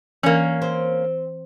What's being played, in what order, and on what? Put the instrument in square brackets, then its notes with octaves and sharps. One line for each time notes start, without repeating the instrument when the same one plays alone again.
[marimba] E3 [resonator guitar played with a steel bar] A#3 C#4
[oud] C4